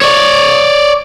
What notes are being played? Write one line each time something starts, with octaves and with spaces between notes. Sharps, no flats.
C#5 D5